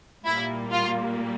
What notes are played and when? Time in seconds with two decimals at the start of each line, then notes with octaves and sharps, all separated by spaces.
0.25 A#2 G3 A#3 E4
0.71 F4